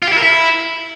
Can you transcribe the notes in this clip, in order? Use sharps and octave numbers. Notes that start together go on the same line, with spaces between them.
F4
G4
E4
A#4
E4